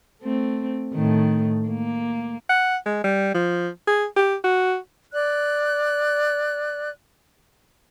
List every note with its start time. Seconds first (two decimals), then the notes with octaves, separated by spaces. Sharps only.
0.22 A3 C4
0.94 A2 D#3 A3
1.68 A#3
2.49 F#5
2.86 G#3
3.04 G3
3.34 F3
3.87 G#4
4.16 G4
4.44 F#4
5.13 D5 F#6